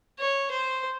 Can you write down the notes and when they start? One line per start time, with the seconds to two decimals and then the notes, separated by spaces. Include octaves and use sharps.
0.19 C#5
0.51 C5